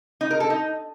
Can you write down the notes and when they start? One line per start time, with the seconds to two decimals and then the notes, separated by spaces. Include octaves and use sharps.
0.21 D#4
0.31 A#4
0.40 A4
0.50 D#4